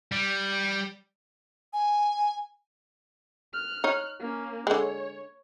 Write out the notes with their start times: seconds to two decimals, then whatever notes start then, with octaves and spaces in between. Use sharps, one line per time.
0.12 G3
1.73 G#5
3.53 F6 F#6
3.84 D#4 C#5
4.20 A#3 C#4
4.67 D3 G#3 C#5